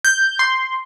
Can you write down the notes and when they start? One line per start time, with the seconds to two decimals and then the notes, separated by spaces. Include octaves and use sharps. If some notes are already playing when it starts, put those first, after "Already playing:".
0.05 G6
0.39 C6